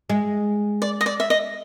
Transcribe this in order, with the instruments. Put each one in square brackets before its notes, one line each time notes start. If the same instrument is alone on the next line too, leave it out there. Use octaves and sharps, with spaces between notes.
[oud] G#3
[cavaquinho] D5
D#5
D5
E5
D#5